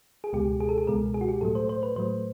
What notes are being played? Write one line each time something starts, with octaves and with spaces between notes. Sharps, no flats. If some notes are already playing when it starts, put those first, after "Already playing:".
G#4
C#2 B2 G#3 G4
G#4
A4
G#4
C#2 B2 G#3 A#4
G#4
F#4
G4
A2 F#3 A3 A4
C5
C5
B4
A2 F#3 A3 C5